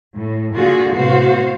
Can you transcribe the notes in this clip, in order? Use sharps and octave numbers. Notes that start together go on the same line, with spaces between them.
A2
A#2 D3 F4 F#4 G#4
A2 C3 B3 F#4 C5 F5